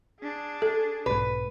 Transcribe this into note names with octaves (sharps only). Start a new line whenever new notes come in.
D4 G#4
A4
B1 G#2 B4